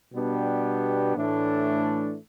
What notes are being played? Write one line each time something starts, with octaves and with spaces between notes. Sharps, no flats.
B2 G3 B3 D4 G4
A2 E3 A3 D4